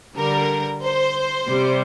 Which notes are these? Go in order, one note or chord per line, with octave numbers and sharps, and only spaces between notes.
D3 G3 A#4
C5
C3 G3